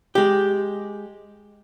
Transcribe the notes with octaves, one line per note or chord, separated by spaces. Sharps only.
G#3 G4